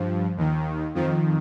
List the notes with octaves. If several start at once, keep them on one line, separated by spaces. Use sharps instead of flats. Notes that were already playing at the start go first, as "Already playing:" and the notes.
Already playing: G2 F3
D#2 D#3
F2 D#3 F3